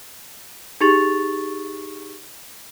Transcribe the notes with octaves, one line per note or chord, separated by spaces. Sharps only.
D#4 G4 G#4 C#6 A6 F7